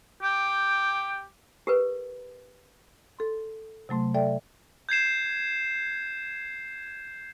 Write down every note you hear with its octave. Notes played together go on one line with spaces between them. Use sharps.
G4 G5
G4 A#4 B4
A4 C6
C3 F#3 A3 C6
A4 D5 E5 G5
G6 G#6 C7 E7